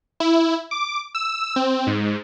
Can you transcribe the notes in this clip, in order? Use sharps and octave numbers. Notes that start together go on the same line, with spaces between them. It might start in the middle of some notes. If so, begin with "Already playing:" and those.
E4
D6
E6
C4
G#2